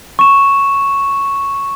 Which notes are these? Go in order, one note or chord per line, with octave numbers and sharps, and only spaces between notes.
C#6 E7